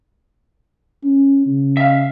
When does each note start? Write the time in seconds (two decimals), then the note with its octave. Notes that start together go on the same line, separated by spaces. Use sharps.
1.04 C#4
1.46 C#3
1.77 E5 F5